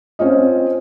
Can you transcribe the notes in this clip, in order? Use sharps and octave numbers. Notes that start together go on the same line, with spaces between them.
C4 C#4 F4 D#5